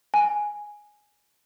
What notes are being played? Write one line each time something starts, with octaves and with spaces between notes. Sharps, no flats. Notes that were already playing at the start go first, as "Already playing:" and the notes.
G#5